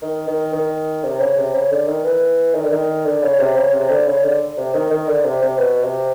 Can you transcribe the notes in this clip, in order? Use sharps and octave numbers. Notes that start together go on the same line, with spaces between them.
D#3
D#3
D#3
C3
C#3
C3
C#3
D3
D#3
E3
D#3
D3
D#3
D3
C#3
C3
C#3
C3
D3
C#3
D3
C3
D#3
D#3
D3
C3
C3
B2
C3